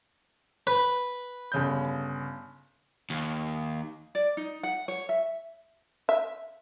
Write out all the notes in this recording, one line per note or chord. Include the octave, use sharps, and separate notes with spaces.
B4
G1 C#3 G6
D#2
D5
D#4
F#5
C#5
E5
E5